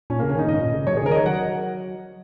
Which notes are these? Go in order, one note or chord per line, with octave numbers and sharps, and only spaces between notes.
A#2 C#4
C#3 A#3
C#4
D#3 D#4
G#2 D#5
A#2
C#3
F#3 C#5
D#3 G#4
C#3
A#4
D#3 D#5
C#5
F#3 F#5